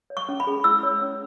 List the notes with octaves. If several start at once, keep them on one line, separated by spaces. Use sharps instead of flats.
C#5
C#6
C#4
B5
G#4
E4 E6
C#5
C#4